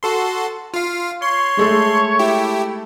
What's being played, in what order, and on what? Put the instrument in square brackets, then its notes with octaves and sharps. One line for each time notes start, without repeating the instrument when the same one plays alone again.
[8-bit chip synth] F#4 A4 C6
F4 F5
[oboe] C#5 [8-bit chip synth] C6
[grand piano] G#3 A3 A4
[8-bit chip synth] E4 G4